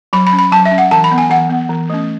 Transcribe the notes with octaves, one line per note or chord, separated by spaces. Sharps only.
F#3 B5
B5
C#4
B5
F#3 A5
E5
C#4
F#5
E3 A5
B5
B3
G#5
E3 F#5
B3
E3
A3 C#4